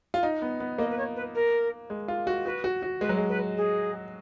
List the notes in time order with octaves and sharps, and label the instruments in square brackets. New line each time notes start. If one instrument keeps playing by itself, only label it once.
[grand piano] F4
D#4
B3
B3
[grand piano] A#3 [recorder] D#5
[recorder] B4
C#5
B4
A#4
[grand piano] G#3
F4
F#4
[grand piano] F#4 [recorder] B4
[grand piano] F#4
F#4
[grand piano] G#3 [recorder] B4
[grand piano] F#3
G#3
[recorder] B4
G#4